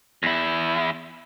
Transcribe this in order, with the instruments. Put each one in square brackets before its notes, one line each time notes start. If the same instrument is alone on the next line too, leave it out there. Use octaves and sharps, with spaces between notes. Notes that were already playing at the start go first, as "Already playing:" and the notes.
[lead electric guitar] E2 E4